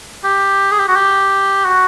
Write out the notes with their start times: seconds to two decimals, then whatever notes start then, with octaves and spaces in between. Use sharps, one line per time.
0.24 G4
0.72 G#4
0.79 G4
0.88 F#4
0.96 G4
1.65 F#4